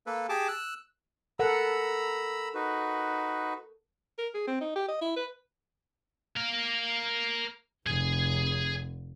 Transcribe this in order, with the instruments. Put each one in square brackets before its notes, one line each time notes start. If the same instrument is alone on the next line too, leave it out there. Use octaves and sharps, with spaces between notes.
[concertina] A#3 A4 B4
G4 G#4 A5 D6
E6 F#6
[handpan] A4 A#4 F#5 [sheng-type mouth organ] A#5 B5 E6
[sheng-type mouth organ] D#4 F#4 B4
[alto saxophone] A#4
G#4
C4
D#4
G4
D#5
E4
B4
[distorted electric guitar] A#4 F5
[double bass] F1 [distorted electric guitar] G#4 G#5